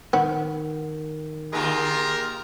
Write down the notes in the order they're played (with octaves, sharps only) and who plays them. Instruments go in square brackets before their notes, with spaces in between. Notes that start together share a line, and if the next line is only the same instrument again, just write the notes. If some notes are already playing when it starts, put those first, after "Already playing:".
[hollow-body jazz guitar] D#3 [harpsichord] B3
[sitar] D3 A#3 F4 [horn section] G4 G#4 A#4